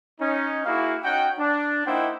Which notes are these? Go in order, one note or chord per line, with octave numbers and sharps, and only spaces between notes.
C#4 D#4
A#3 E4 F#4 G#4 F5
C#4 D#4 F#4 F#5 G5
D4
A#3 D#4 E4 C5 F#5 G5